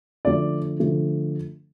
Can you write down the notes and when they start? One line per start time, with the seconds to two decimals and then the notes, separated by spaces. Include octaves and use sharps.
0.25 D3 F3 A3 D5
0.80 D3 F3 A3